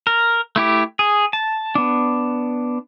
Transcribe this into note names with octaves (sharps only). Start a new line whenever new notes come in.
A#4
A3 E4 G4
G#4
A5
B3 D4